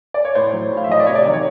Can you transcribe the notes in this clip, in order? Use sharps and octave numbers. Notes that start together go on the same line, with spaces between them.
D5
C#5
A2 C5
F#3
A2
F5
E5
F#3 D#5
D5
C3 C#5
D5
D#3 F#3 D5
C#5